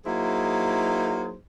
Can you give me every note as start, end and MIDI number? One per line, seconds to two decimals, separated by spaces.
0.05 1.34 54
0.05 1.34 58
0.05 1.34 63
0.05 1.34 64
0.05 1.34 68
0.05 1.34 72